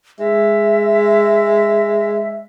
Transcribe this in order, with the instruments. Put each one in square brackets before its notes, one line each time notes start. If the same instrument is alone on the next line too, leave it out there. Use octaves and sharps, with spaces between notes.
[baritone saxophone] G#3 [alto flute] E5